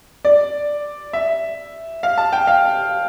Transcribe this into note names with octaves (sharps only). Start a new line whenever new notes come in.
D5
E5
F5
A5
G5
F5